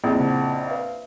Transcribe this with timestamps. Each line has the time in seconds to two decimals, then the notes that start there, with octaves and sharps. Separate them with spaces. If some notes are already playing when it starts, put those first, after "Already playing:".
0.04 A#1 F2 E4 G#4
0.20 C#3 F#5 A5
0.67 B4 E5 F5